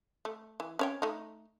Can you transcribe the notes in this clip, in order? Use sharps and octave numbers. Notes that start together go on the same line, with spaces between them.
A3
E3
C#4 C#5 G5
A3 D#4